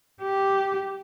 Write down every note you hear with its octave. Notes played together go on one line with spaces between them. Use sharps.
G4